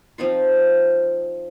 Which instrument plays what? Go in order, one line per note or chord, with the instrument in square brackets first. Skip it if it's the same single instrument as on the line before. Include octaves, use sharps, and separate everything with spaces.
[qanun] F3 C4 D#4 F4